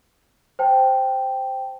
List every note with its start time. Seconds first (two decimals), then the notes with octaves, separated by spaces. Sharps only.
0.59 C5 G5 A5